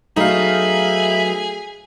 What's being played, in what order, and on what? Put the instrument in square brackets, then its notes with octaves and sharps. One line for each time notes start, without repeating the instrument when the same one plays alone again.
[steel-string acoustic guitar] F#3 A3 B3 [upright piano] D#4 F5 [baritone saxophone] G#4 [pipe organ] E5 B5